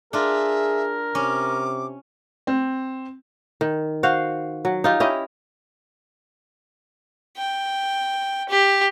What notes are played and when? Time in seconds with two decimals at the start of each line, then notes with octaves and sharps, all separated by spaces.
0.13 D4 F4 G#4 A#4 E5
1.15 C3 C#4 D6
2.47 C4
3.61 D#3
4.03 F#4 C5 F5
4.65 F#3
4.84 D#4 F4 G4
5.00 C#4 E4 G4 D#5
7.37 G5
8.49 G4